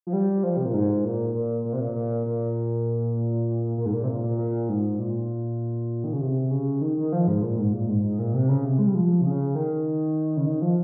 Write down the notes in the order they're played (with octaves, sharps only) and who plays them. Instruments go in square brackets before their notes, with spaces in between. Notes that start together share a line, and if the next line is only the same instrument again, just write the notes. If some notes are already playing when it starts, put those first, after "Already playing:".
[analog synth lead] F3
G3
F3
C3
A#2
G#2
A#2
A#2
A#2
C3
A#2
A#2
A#2
A#2
G#2
A#2
C3
A#2
A#2
A#2
G#2
A#2
D#3
C#3
C3
C#3
D#3
D#3
F3
G#2
A#2
G#2
A#2
G#2
G#2
A#2
C3
C#3
C3
G#3
G3
F3
C3
C#3
D#3
C#3
D#3
F3